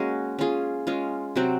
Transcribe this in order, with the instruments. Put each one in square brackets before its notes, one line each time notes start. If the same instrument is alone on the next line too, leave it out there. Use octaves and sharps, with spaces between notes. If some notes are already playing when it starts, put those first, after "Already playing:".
Already playing: [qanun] G#3 A#3 C#4 F#4
C#4 F4 G#4
G#3 C#4 F4
C3 F#3 C4 F#4